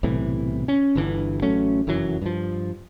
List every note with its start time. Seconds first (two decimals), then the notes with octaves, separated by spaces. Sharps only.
0.03 B1 A2 C3 E3
0.68 C#4
0.95 G1 G2 D3 E3
1.42 A1 F#3 A3 C#4
1.87 F1 F#2 E3 F#3
2.22 G2 F3